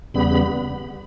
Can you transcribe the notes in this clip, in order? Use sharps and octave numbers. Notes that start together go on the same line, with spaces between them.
E2 C#3 G3 B3 B5